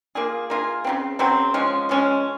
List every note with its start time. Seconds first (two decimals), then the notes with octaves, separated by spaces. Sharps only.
0.15 A#3 F4 G#4
0.50 A#3 F4 G#4
0.85 C#3 F#3 C4
1.19 C#3 F#3 C4
1.54 F3 G#3 C#4
1.89 F3 G#3 C#4